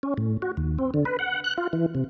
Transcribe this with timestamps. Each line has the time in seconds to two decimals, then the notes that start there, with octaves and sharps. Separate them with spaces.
0.03 C#4
0.18 A2
0.42 F#4
0.57 D#2
0.78 C4
0.94 D3
1.05 B4
1.19 F#5
1.44 F#6
1.58 F4
1.73 E3
1.95 C3